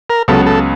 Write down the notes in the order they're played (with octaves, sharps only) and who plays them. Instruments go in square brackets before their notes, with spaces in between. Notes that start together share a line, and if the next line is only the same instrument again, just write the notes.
[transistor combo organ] A#4
[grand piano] C#2 C#3 F#3 B3 [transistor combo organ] A4
[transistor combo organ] A4